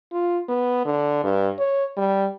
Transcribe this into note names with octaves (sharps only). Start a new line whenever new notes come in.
F4
B3
D3
G2
C#5
G3